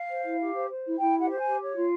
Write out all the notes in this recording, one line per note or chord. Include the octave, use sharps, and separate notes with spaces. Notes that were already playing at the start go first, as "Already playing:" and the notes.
Already playing: F5
C5
E4
G4
C5
C5
E4
E4 G5
G4 F#5
C5
G#5
G4
C#5
F4